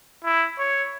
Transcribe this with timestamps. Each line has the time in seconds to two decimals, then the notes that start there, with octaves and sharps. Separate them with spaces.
0.24 E4
0.59 C#5